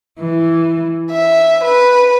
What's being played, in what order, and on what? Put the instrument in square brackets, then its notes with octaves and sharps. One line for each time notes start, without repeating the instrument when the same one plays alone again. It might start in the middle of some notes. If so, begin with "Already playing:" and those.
[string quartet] E3
E5
B4